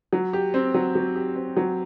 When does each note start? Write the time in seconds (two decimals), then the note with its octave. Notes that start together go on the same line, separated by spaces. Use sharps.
0.13 F#3
0.33 G4
0.54 C4
0.74 F#3
0.95 F#3
1.16 G4
1.36 C4
1.57 F#3